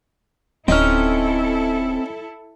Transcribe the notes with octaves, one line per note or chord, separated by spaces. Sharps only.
D1 C4 C#4 D#4 E4 A4 F6